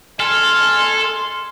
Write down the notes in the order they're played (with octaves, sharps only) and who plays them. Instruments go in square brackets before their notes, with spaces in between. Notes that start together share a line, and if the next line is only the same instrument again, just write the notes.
[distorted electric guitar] A4 [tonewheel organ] G#5 F6 [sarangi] C6